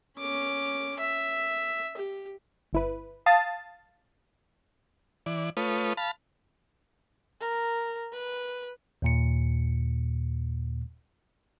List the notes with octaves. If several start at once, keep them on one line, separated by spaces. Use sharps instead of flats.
C#4 D6
E5
G4
G1 E4 B4
F5 A5 D#6 A6
E3 D5
A3 F4 B4 C#5 D#6
F5 A5 B5
A#4
B4
D#2 A#2 C#7